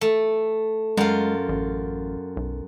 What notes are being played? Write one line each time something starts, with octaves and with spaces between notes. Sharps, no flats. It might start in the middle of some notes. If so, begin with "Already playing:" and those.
A3
F#2 G#3 F4
A1
B1